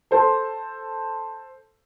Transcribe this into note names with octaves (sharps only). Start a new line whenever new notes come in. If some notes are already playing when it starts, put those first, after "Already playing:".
A4 C5 A5 C6